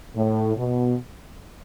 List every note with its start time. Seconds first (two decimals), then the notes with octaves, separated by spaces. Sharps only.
0.15 A2
0.57 B2